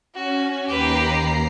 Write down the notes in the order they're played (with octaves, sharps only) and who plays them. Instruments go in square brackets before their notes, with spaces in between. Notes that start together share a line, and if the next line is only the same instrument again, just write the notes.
[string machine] C#4 [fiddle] F#4
[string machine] D#2 A#5 C7 [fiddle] G4 B4